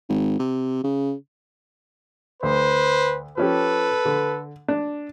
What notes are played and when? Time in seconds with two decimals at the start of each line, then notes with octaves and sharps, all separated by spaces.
0.09 G#1
0.39 C3
0.84 C#3
2.43 D2 B4 C5
3.37 F3 C#4 G4 A4 B4
4.05 D3
4.68 D4